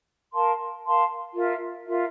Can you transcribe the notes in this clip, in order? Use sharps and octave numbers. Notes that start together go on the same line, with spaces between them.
A#4 F5 A5 C6
A#4 F5 A5 C6
F4 A#4 E5
F4 A#4 E5